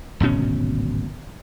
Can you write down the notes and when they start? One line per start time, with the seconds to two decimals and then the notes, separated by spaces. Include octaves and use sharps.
0.20 D1 G#1 B2 C#4